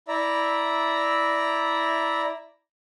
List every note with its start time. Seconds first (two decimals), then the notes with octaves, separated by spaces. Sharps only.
0.08 E4 D5 E5 A#5